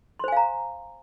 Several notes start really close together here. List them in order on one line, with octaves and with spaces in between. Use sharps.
C6 C5 G#5 F5 A#5